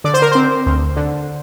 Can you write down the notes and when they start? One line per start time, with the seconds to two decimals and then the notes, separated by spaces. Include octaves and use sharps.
0.04 D3 D5
0.14 C5
0.22 A#4
0.32 C4 C5
0.66 D2
0.96 D3